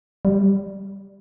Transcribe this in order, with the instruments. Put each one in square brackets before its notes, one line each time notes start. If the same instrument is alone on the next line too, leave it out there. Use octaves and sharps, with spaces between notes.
[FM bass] G3